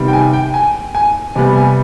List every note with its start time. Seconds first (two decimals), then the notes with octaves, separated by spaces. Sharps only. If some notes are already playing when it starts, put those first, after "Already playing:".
Already playing: C3 D#3 G3 B3
0.08 G5
0.13 G#5
0.33 G5
0.54 G#5
0.95 G#5
1.35 C3 G3 B3 G#5
1.56 G#5